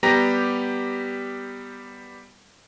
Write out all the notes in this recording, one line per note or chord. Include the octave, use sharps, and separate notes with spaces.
G3 B3 G4 A#5 A#6